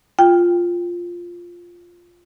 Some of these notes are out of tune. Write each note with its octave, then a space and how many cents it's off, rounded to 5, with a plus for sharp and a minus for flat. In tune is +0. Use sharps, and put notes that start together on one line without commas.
F4 +0 G5 +20